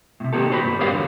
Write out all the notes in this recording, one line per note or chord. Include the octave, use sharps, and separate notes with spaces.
A2 C3
D#3 A#3 G4 A4
F#4 G4 C5 C#5 B5
G2
G4 G#4 A#4 C5 C#5 F5
E2 D3